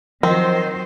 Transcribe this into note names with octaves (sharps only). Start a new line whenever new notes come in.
D#3 F3 F#3 C4 A#4 C5 D#5